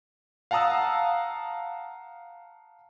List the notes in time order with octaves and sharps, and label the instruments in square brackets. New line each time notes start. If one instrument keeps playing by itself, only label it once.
[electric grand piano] F5 F#5 A5 A#5 D#6 E6